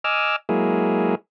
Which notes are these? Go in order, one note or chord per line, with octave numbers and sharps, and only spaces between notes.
D#5 G#5 D6 E6 F6
F#3 G#3 A#3 E4 G#4